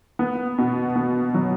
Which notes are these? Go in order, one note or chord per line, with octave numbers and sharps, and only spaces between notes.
B3
B2
B3
F#3